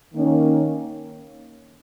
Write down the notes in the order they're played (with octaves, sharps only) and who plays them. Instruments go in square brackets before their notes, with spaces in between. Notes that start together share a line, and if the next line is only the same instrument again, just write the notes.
[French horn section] D#3 A#3 C#4